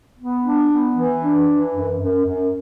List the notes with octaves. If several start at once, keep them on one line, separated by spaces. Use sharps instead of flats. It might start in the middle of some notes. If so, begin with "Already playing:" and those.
B3
D4
B3
E3
D4
E3
F#2
F#2
F#2